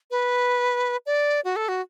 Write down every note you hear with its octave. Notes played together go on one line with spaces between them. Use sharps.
B4
D5
F#4
A4
F#4